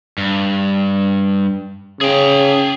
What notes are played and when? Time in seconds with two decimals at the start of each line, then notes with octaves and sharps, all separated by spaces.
0.18 G2
2.01 C#3 G#4 G5